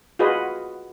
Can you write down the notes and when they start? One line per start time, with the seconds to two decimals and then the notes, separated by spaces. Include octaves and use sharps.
0.19 F4 F#4 G#4 B4 D#5